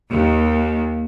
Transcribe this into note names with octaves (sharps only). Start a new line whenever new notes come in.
D#2